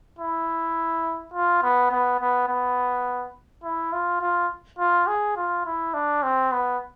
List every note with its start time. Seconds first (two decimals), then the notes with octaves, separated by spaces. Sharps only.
0.19 E4
1.34 F4
1.63 B3
1.92 B3
2.20 B3
2.48 B3
3.64 E4
3.93 F4
4.21 F4
4.79 F4
5.07 G#4
5.37 F4
5.66 E4
5.94 D4
6.23 C4
6.52 B3